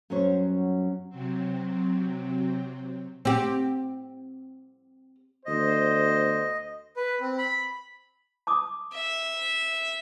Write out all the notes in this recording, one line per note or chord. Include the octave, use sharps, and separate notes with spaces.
F#2 F#3 G3 C#4 C5 C#5
C3 F#3 C4
C4 G4
D2 B3 C5 D#5
B4
C4
B5
A5 D6 D#6
E5